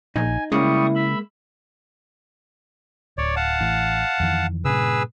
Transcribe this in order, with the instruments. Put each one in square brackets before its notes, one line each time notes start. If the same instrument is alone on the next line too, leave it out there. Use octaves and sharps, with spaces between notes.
[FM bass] A#1 [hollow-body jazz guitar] D#4 [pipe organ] G#5
[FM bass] C#3 [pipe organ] G3 C#6 D#6 [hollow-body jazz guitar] G#3 A#3 [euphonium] E4
[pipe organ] E5 B5
[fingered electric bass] D1 [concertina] C#5 D5
[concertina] F5 F#5 A5
[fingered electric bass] A1 E3
F2 D#3 E3
[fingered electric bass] G2 A#2 C#3 [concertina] G#4 B4 E6